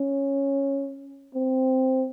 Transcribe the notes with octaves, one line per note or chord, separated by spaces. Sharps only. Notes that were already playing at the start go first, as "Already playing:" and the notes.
Already playing: C#4
C4